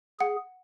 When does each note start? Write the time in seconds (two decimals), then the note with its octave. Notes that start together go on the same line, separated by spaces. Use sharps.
0.20 G#4 F#5